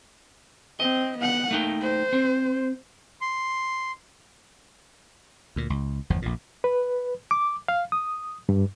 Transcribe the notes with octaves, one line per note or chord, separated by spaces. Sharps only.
C4 D#5
B3 F#5
A3 A#3 D#4 G5
C5
C4
C6
D2 A#2
C#2
G1 E2 F3
A#1 F2 A#2
B4
D6
F5
D#6
G2